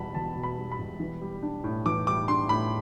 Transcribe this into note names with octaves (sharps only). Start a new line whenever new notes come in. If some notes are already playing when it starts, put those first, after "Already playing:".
Already playing: E1 E2 B2 G3 A5 B5
E2 A5
B2
B5
G3
B5
E1
E3
G3
D4
A2
E3 D6
G3 D6
D4 C6
A2 B5